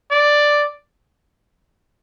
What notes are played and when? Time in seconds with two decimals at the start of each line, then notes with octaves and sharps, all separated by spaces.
0.11 D5